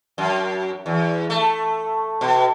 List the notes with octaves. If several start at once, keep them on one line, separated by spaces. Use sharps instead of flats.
F#2
E2
A3
B2